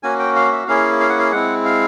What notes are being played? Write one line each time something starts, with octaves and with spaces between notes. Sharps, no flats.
A#3 C#4 F#4 G#5
G5
F5
E5
A#3 C#4 E4 G#4 F5
F5
F#5
F5
G#3 C4 E4 F#5
F5